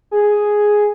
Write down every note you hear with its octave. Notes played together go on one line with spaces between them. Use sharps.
G#4